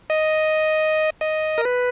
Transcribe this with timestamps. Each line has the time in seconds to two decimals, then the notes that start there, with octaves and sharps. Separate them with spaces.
0.10 D#5
1.21 D#5
1.58 A#4
1.65 B4